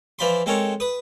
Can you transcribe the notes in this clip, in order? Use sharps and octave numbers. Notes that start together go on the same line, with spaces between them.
E3 F3 D5 B5 C6
G#3 C4 A4 A#4 C#5
B4 D#6